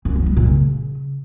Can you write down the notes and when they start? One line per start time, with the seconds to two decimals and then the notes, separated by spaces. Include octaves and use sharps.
0.05 F#2
0.16 F3
0.26 G3
0.37 A#2
0.47 C#3